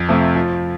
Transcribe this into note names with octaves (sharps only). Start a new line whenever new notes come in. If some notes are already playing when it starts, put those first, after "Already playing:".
Already playing: F2
C3 F3 A3
F3